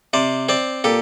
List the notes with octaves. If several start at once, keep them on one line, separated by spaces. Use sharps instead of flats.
C3 C5 D5
C4 C5 D5
A#2 G4 A4